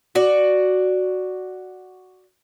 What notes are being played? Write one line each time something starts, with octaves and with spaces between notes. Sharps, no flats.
F#4 D5